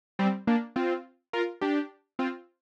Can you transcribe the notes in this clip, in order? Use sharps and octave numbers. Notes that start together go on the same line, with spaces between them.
G3 C4
A#3 D4
C4 F4
F4 A#4
D4 G4
C4 F4